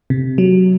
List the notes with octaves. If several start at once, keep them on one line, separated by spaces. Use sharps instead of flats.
C3
F#3